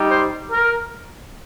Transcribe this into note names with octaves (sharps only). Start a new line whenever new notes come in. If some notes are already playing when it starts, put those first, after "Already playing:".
Already playing: G3 D#4 G4
C5
A#4